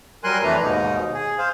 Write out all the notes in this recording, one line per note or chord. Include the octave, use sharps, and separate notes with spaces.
F#3 G3 A#4 G#5 C6 F#6
F2 E3 A3 D4 B4 A#5
D#2 G#2 B2 D#4
G#4
C5 F5